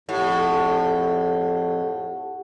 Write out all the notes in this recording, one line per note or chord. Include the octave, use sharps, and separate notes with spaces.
F2 A2 G4 F#5